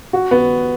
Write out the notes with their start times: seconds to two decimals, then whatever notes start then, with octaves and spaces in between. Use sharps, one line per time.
0.13 F#4
0.31 B3